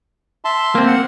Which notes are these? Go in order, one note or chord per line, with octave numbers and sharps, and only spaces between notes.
E5 A5 C6
A#3 C4
F#5